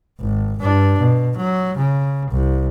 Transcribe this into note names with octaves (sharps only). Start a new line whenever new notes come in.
G#1
G2 D4
B2
F#3
C#3
C2